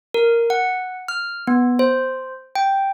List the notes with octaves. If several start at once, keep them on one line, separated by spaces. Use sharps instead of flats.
A#4
F#5
F6
B3
C5
G5